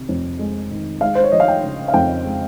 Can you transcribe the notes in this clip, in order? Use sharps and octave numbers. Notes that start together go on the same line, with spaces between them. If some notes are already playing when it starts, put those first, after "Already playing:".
Already playing: C3 D#3
F2
G#3
D#3
G#3 F5
C5
C#5
F3 D#5
F5
G5
C#3
F5
F2 G5
G#3